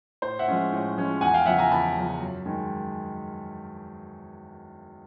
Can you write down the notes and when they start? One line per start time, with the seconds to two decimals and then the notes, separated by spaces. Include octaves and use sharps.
0.22 A2 C5
0.39 E5 F#5
0.48 F3 G#3 C#4
0.72 A2
0.97 F3 G#3 C#4
1.21 E2 F#5 G#5
1.34 F5 G5
1.46 C#3 F3 E5 F#5
1.58 G#5 A#5
1.71 E2 A5 B5
1.96 C#3 F3
2.20 F#2
2.46 D#3 G#3